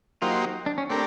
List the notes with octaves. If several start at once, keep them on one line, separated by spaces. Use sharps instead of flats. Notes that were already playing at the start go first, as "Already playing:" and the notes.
F#3 A#3 D#4 F4 G4 C5
D4
C#4
A3 C4 D4 G4 A#4